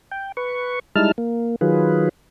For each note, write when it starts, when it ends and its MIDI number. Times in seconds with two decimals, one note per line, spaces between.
0.11 0.32 79
0.37 0.79 71
0.37 0.79 85
0.96 1.12 55
0.96 1.12 56
0.96 1.12 63
0.96 1.12 64
0.96 1.12 81
0.96 1.12 89
1.18 1.56 58
1.61 2.09 51
1.61 2.09 54
1.61 2.09 65
1.61 2.09 68
1.61 2.09 71